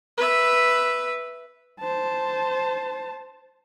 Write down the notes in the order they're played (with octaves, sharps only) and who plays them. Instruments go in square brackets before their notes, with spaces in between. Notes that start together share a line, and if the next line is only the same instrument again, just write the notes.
[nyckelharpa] B4 E5
[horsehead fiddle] C5 A5